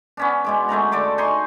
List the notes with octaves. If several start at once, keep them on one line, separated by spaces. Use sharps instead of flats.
B3 C#4 D4
B2 G#3 D6
G#3 A3 F#5 A#5
D3 A4 D5 D6
D#4 G#5 C6 C#6